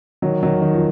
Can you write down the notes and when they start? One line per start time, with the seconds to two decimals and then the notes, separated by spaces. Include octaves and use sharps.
0.22 D#3 F#3
0.43 D#3 F#3
0.62 D#3
0.73 F3